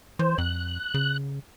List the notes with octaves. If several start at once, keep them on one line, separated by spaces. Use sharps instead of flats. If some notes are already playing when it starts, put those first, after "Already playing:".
E3 C5
F2 F#6
C#3